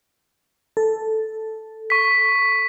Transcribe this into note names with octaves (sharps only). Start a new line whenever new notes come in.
A4
C#6 B6